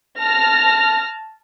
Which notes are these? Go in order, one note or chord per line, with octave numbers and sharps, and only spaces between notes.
A5 F6 A#6